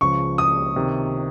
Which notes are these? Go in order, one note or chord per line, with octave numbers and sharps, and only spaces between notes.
C#2 C#3 F3 C#6
D#6
C3 D#3